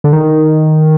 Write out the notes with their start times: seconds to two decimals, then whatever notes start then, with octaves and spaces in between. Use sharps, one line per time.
0.04 D3
0.13 D#3